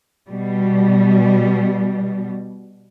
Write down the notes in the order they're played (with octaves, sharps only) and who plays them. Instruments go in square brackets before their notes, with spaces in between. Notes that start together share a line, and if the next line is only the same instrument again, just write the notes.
[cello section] B2 G3